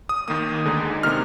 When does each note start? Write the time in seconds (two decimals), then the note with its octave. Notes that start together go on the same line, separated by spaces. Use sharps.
0.09 D#6
0.28 D#2 D#3 A#3 D#6
0.65 D2 D3 G#3 D#4
1.03 C3 D#3 A#3 F6